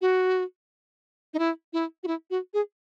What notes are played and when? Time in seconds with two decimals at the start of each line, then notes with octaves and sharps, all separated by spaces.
0.01 F#4
1.34 D#4
1.39 E4
1.73 E4
2.03 F#4
2.07 E4
2.30 F#4
2.54 G#4